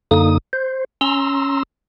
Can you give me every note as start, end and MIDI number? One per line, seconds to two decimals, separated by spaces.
0.11 0.38 42
0.11 0.38 50
0.11 0.38 58
0.11 0.38 63
0.11 0.38 87
0.53 0.84 72
1.01 1.63 61
1.01 1.63 82
1.01 1.63 84
1.01 1.63 88